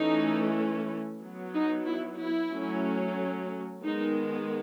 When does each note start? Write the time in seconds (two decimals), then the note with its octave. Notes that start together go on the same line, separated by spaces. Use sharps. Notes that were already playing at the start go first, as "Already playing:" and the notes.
Already playing: E3 A3 C#4 D#4
1.21 F#3 B3
1.53 D#4
1.86 E4
2.19 E4
2.51 F#3 A3 C#4
3.82 D#3 G#3 B3 D#4